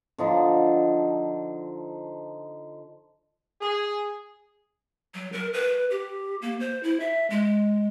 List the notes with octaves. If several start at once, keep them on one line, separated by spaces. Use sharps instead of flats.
D3 F3 D#4
G#4
F#3
A#4
B4
G4
A#3
C5
E4
E5
G#3